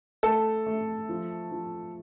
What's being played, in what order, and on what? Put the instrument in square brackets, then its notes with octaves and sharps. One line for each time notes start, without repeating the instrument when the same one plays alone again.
[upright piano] A3 [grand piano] A4
[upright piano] A3
F3
F3